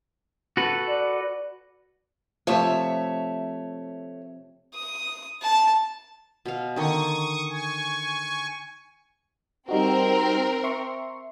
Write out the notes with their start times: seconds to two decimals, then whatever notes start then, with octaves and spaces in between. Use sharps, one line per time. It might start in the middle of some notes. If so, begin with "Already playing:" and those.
0.57 F#4 A4 B4
0.89 D5
2.47 C3 F3 A3 C#5 E5
4.74 D#6
5.42 A5
6.46 B2 F5
6.76 D3 D#3 C6 C#6 D#6
7.50 G#5 C#6
9.69 G3 C4 D#4 F#4 A#4
10.64 E5 C6 C#6